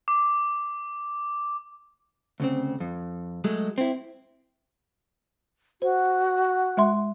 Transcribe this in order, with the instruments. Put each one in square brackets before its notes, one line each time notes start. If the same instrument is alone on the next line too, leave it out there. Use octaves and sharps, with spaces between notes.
[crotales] D6
[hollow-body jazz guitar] D2 C#3 C4
F2
F#3 G#3 A3
C4 E4
[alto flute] F#4 [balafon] C5
[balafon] G#3 E5 C6